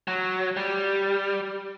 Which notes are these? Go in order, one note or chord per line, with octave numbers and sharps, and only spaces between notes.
F#3
G3